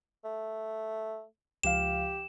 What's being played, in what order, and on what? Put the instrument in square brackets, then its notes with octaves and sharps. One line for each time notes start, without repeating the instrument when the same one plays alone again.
[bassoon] A3
[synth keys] C#2 F3 F5 [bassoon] G4 [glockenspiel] E7